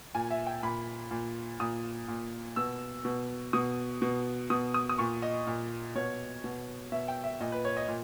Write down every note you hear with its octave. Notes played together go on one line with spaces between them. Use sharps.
A#2 G#5
E5
G5
A#2 B5
A#2
A#2 D#6
A#2
B2 E6
B2
B2 D#6
B2
B2 D#6
D#6
D#6
A#2 C#6
D#5
A#2
B2 C#5
B2
B2 E5
G5
E5
A#2 D#5
B4
C#5
D#5
A#2